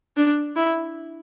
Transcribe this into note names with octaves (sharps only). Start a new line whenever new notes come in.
D4
E4